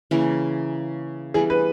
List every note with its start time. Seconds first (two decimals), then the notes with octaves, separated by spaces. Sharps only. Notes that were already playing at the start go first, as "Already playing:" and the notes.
0.11 C#3 E3 A#3 C#4
1.34 E3 G3 B3 G#4
1.50 B4